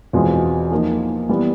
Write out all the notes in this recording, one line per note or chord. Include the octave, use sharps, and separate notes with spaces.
E2 B2 G#3 C4 F4
F3 A#3 D#4
E3 G3 B3